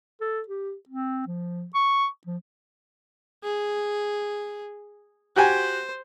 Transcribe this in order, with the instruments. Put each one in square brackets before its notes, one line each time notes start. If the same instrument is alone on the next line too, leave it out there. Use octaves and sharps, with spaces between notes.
[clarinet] A4
G4
C4
F3
C#6
F3
[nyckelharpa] G#4
[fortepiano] F#4 G4 G#5 [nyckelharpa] C5